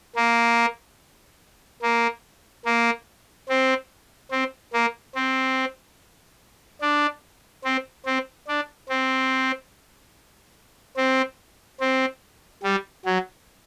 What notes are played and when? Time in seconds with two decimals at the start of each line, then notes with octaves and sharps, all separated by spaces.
0.16 A#3
1.82 A#3
2.65 A#3
3.49 C4
4.31 C4
4.73 A#3
5.15 C4
6.81 D4
7.64 C4
8.06 C4
8.48 D4
8.89 C4
10.97 C4
11.80 C4
12.63 G3
13.05 F#3